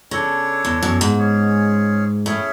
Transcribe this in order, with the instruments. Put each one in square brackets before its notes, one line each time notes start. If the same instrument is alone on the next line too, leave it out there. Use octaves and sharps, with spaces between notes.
[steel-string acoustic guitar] C#3 [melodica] D4 A4 C#5
[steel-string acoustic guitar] E2
F#2
G#2
[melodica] C#4 G#4 C#5
[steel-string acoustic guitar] A2 [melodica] C#4 G#4 C#5 E5